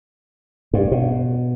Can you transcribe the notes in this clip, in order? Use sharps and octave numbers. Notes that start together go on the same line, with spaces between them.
G2
B2